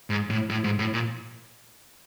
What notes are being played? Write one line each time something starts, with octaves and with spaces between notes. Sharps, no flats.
G#2
A2
A2
G#2
A2
A#2